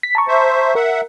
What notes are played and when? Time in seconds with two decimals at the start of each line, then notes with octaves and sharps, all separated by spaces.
0.03 B6
0.15 A5 A#5 C#6
0.28 C5 E5
0.75 A#4 E5 F#5